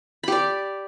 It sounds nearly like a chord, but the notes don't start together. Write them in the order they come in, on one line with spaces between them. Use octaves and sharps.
B5 G4 D5